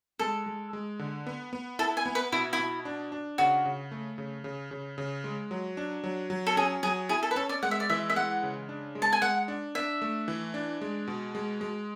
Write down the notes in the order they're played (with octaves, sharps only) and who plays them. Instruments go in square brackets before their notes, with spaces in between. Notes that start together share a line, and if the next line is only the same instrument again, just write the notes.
[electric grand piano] G#3 [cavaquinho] A4
[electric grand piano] G#3
G#3
D3
B3
B3
[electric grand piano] E4 [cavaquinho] A4
[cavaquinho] G#5
[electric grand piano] B3
[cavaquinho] B4
[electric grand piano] B2 [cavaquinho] E4
[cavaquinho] E4
[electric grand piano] B2
D4
D4
[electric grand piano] C#3 [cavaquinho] F#4
[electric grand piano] C#3
A3
C#3
C#3
C#3
C#3
G#3
F#3
D4
F#3
F#3
[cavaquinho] A4
[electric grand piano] C#4 [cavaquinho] G#4
[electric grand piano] F#3 [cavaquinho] G#4
[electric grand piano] E4 [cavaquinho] G#4
[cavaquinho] A4
B4
[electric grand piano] C#4 [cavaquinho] A4
[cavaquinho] D5
[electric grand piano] G#3 [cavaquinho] F#5
[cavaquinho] E5
D5
[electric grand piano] E3 [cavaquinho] E5
[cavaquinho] E5
[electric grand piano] G#3 [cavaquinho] F#5
[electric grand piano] C#3
D4
G#3
[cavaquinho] A5
G#5
[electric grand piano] G#3 [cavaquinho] F#5
[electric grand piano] D4
[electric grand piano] D4 [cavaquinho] E5
[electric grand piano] A3
E3
D4
G#3
B2
G#3
G#3